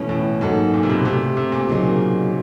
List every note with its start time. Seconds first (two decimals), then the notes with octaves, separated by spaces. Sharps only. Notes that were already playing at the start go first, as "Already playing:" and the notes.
Already playing: B2 E3 A3 C#4
0.09 A2
0.41 G#2 F#3 A#3 D#4 F#4 A4
0.74 A#2
0.83 C3
0.89 B2
1.05 C3 A3 D4 G4
1.37 C3
1.52 A#2
1.68 C#3 F#3 A#3 D#4 G#4